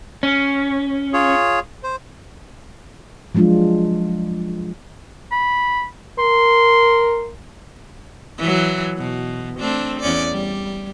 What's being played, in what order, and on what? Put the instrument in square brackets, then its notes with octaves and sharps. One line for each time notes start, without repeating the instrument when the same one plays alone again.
[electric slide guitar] C#4
[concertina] F4 G#4 C#5
C5
[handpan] F3 F#3 G#3 D4 F4
[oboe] B5
[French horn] A#4 [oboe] C6
[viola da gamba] E3 F#3
B2
A3 C4 D4
E2 C#4 D5
G3